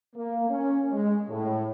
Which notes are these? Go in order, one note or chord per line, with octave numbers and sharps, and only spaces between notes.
A#3
C#4
G#3
A2